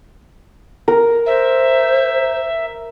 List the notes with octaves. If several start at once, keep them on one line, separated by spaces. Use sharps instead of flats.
A#4
C5 E5